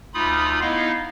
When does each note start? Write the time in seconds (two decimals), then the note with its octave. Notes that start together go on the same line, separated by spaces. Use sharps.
0.14 D2 D#4 F4 B5 D#6
0.61 B3 D#4 E4 D#5 F5